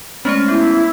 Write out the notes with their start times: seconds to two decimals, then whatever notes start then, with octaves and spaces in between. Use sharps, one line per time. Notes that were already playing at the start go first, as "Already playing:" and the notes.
0.25 G#3 A3 C#4 C5
0.48 B3 E4